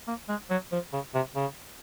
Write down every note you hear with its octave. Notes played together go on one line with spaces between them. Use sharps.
A#3
G#3
F#3
F3
C#3
C3
C#3